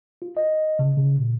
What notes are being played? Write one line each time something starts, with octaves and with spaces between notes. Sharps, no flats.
F4
D#5
C#3
C#3
A#2